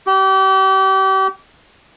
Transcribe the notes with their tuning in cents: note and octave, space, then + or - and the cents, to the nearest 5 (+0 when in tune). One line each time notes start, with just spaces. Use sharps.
G4 -35